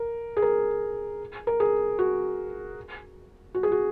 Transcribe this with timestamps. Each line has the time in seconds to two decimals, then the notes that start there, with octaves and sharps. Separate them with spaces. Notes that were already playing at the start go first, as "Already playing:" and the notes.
Already playing: A#4
0.37 G#4
0.42 A#4
1.47 A#4
1.60 G#4
1.99 F#4
3.55 F#4
3.63 G#4
3.72 F#4